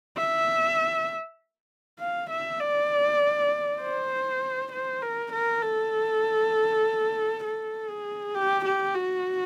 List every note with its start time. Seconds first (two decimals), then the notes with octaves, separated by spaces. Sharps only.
0.18 E5
2.00 F5
2.30 E5
2.60 D5
3.82 C5
4.72 C5
5.02 A#4
5.33 A#4
5.63 A4
7.44 A4
7.90 G#4
8.35 G4
8.66 G4
8.95 F#4